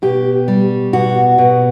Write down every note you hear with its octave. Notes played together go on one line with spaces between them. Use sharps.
B2 G4
G3
B2 F#4
B2